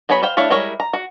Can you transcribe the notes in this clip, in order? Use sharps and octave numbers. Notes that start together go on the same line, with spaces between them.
F#3 B3 G#4 C#5 B5
C5 F5 G5
A3 D4 E4 C#5 F5
G3 G#3 E4 A#4 C#5
A#5
F#4